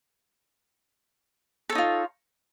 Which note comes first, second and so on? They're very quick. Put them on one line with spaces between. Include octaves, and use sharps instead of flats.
A4 C#5 D#4 F4